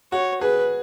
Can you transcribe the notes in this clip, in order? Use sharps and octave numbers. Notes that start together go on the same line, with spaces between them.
F#4 C#5
G#4 B4